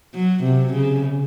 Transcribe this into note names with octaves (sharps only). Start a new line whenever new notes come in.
F#3
C3
C#3